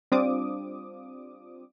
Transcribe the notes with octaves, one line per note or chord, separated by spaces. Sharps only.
G3 C4 D4 F4 D6 D#6